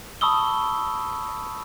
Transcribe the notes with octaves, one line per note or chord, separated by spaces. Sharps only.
A5 B5 C#6 D#6 E6 G7